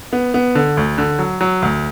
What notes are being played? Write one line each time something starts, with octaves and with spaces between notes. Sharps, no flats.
B3
B3
D3
D2
D3
F#3
F#3
D2